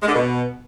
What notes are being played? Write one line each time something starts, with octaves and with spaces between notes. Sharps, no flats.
G#3
D3
B2